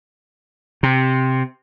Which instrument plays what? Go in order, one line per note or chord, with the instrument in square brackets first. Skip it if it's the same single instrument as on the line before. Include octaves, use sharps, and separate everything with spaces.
[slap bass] C3